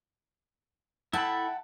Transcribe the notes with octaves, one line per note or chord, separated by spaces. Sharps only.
E4 A4 F#5 G5 A5 B5